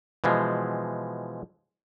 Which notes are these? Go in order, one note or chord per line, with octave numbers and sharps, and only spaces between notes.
B2 E3 F3 G#3